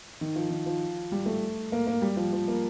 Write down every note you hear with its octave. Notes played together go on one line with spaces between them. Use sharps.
D#3
F3
D#3
F3
G3
A3
A#3
A#3
G3
F3
F3
A#3